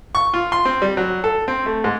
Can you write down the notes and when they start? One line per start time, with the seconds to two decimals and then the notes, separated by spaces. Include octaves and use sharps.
0.15 C#6
0.34 F4
0.52 C6
0.65 C4
0.82 G3
0.97 F#3
1.24 A4
1.48 C4
1.66 A3
1.84 G#2